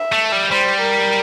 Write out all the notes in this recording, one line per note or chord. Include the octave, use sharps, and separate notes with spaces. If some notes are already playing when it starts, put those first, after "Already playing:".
Already playing: E5
A3
G3
G3 C5
A#4